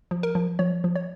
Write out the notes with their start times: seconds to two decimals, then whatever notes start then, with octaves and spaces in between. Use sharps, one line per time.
0.11 F3
0.23 A#4
0.35 F3
0.59 F3 C#5
0.84 F3
0.96 C#5